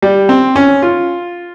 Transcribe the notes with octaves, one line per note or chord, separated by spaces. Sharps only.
G3
C4
C#4
F4